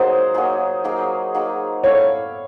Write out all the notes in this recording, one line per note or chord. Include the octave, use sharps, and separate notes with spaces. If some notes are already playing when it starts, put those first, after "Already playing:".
Already playing: F#3 A#3 D#4 G#4 C5
F#3 A#3 D#4 G#4
F#3 A#3 D#4 G#4
F#3 A#3 D#4 G#4
E4 A4 C#5 D5 F5